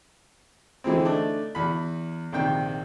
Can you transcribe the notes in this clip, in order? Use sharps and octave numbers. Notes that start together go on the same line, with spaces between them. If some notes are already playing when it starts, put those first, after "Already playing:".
D3 E3 G#3 C4
A3 D4 D#4
E2 B5
A#1 C3 D#3 G5